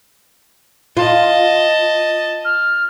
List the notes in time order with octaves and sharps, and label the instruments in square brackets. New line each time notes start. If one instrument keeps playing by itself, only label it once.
[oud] F4 [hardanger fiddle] D#5 A5
[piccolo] F6